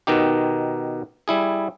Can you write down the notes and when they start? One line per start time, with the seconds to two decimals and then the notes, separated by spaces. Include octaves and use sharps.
0.07 B2 D#3 D#4 G4
1.28 G3 E4 G#4